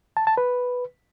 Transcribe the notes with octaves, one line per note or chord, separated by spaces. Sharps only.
A5
A5
B4